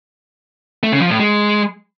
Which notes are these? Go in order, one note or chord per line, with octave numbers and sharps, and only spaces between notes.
A3
C#3
F3
A2
G#3